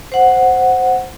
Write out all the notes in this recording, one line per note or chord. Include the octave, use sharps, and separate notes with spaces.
C5 F#5